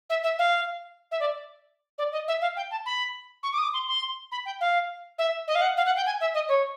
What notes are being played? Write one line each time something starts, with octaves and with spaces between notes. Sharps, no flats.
E5
E5
F5
E5
D5
D5
D#5
E5
F5
G5
A5
B5
C#6
D6
D#6
D6
C6
C6
B5
G5
F5
E5
D#5
F5
F#5
F5
F#5
G5
G#5
E5
D#5
C#5